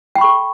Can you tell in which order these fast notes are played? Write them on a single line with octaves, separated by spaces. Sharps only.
G5 B5 C#6 A4